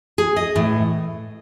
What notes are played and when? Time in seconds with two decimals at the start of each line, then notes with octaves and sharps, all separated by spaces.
0.18 G#4
0.36 D#5
0.56 A2 E3